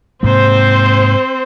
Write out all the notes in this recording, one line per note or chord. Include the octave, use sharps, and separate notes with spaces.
G#2 C3 A#3 C4 C5